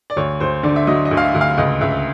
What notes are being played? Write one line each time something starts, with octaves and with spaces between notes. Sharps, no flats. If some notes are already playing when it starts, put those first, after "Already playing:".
D5
D2 C#5
D2 C5
D3 D5
E5
F#3 D#5
D#5
D2
F5
E5
D2
F5
C#2 D#5
C#2 E5